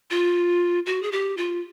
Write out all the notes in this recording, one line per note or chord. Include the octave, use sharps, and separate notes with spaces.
F4
F#4
G#4
G4
F4